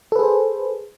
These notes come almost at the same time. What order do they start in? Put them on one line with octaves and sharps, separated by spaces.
A4 B4 G#4 C5